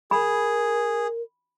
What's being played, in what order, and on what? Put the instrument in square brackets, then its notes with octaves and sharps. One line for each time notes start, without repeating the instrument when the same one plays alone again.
[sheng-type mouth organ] G#4 [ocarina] A#4 [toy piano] B5